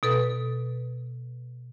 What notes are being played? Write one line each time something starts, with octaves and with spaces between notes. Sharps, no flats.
B2 A4 B4